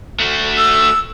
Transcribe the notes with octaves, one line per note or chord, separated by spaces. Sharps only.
A3 F#4
E6